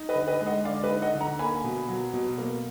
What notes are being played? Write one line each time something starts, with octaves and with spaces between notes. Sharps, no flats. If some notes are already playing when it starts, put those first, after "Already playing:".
Already playing: D#4
B4 D#5
D3
B4 D#5
G#3
D#5 F#5
D3 D5 F5
B4 D#5
D#4
D#5 F#5
D3
F#5 A#5
A#3 G#5 B5
B2
F#3
B2
A#3